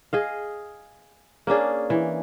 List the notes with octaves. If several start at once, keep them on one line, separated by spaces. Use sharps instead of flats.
G#4 D#5 F5
A#3 C#4 D4 G#4
E3